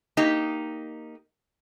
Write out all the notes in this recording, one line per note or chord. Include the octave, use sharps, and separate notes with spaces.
A#3 D#4 G4